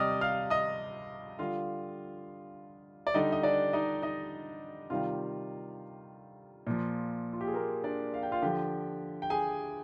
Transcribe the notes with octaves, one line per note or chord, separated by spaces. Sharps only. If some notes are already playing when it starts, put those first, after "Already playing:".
Already playing: C3 G3 D5 D#5 D#6 F6
F5 F6
D#5 D#6
D3 G3 F4 F5
D5
D3 G3 D#4 D#5
D#5
D4 D5
D#4 D#5
D#4 D#5
C3 D#3 G3 F4 F5
A#2 F3
F4
G4
G#4
A#3 A#4
D4 D5
F5
G5
F4 F5
D3 F3 G4 G5
G5
G#4 G#5